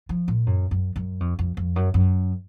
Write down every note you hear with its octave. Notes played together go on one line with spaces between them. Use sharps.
F3
A#2
F#2
F#2
F#2
F2
F2
F2
F#2
F#2